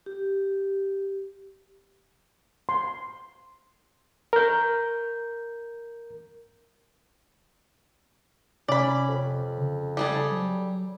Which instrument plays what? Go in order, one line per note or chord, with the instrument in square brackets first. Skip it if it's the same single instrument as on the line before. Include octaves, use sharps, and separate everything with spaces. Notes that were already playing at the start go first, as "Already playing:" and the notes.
[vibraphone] G4
[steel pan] C6
[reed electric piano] A#4 G6
[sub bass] C3 [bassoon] C#4 [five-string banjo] D5 B5
[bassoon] F2
[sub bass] C#3
[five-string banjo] G3 G#4 A4
[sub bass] F#3